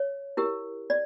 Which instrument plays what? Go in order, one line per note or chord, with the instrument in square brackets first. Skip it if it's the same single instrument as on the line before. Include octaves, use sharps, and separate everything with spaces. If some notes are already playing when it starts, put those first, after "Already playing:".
Already playing: [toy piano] C#5
E4 G4 A#4
D5